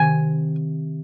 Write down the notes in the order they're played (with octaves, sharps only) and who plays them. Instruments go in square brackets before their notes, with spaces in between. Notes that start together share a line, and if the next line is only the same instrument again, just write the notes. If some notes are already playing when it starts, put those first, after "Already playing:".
Already playing: [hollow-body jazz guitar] C3 D#3 G#5